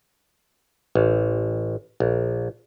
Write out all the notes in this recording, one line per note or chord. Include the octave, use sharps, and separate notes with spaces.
A1
A#1